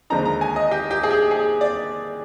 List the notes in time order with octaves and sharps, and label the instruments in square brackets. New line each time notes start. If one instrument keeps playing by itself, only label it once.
[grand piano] D#2 D3 F3 G#3 D#4 A#5
A#5
G#5
D#5
G4
G4
G#4
G4
G#4
D5